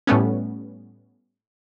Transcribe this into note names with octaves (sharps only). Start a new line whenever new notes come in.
A2 G3 A3 B3 C#4